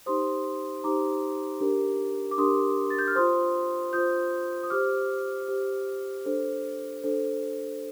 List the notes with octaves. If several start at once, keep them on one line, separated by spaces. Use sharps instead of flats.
D#4 G4 C5 C6 D#6
D#4 G4 C5 A#5 D6
D4 G4 A#4
D6
D4 G4 A#4 C6 D#6
A6
G6
F6
F4 C5 C6 D#6
F4 C5 D#6 G6
D#6
G4 C5 D6 F6
G4 C5
D4 A4 C5
D4 A4 C5